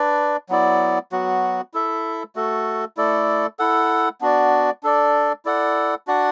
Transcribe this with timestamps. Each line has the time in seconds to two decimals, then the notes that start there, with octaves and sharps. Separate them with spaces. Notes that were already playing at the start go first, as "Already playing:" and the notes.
Already playing: D4 B4 D5
0.49 F#3 B3 E4 D5
1.12 F#3 B3 F#4
1.74 E4 A4 E5
2.36 A3 F#4 A4
2.97 A3 E4 A4 D5
3.59 E4 A4 F#5
4.21 B3 D4 F#4 D5
4.83 D4 A4 D5
5.45 E4 A4 D5 F#5
6.07 D4 F#4 D5 F#5